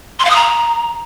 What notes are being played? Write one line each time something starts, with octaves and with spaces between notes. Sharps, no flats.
C6
F5
D#6
A#5